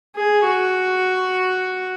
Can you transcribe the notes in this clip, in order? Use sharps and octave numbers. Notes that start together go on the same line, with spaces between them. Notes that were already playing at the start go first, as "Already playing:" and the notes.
G#4
F#4